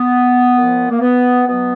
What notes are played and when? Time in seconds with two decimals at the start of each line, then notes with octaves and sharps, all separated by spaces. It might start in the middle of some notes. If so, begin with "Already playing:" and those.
Already playing: B3
0.54 A#2 F3
0.90 A#3
1.00 B3
1.46 B2 F#3 B3